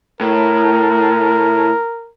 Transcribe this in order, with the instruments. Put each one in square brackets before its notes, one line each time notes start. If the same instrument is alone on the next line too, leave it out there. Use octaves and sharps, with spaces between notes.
[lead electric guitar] A2 [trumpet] A#4